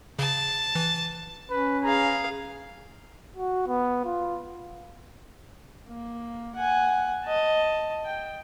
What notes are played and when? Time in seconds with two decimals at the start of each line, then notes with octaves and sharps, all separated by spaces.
0.19 C#3 A5
0.75 E3
1.50 C#4 B4
1.84 G#4 F5 A#5
3.37 F#4
3.67 B3
4.05 F4
5.87 A#3
6.55 F#5 G#5
7.25 D#5 A5
8.05 G5